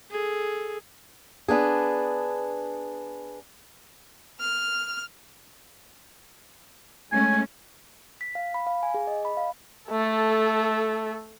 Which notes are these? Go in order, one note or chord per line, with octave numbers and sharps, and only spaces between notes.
G#4 A4
B3 D4 G#4
F6
G#3 A3 C#4 G#5
B6
F5
B5
F5
G#5
G#4
D#5
B5
F5
A3 A4